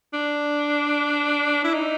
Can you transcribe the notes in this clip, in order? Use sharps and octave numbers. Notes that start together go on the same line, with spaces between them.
D4
E4
D#4